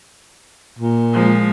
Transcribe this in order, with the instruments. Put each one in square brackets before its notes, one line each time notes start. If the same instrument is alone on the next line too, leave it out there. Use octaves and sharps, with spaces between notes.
[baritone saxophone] A#2
[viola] F3 G#3